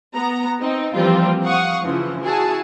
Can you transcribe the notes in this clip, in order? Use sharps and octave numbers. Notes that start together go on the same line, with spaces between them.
B3 A#5
C4 D#4
E3 F3 G3 A#3 C4 F4
F5 F#5 C#6 D#6
C#3 E3 F3
E4 F#4 G#4 G#5 A5